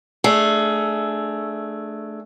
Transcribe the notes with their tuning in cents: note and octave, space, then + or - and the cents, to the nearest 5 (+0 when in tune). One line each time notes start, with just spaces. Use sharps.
A3 -5 D4 +10 G#4 +15